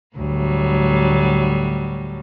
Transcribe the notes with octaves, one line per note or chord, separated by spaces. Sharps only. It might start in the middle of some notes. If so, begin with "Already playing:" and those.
D2 A2 F#3 G3